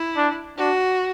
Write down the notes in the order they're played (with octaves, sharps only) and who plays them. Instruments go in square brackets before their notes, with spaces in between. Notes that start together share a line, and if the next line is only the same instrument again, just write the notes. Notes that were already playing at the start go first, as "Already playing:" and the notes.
Already playing: [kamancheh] E4
[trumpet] D4
[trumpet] D4 [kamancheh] F#4